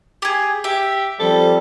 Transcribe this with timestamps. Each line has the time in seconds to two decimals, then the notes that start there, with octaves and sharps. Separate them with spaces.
0.22 G4 G#4
0.64 G4 E5
1.20 F3 G3 C4 A4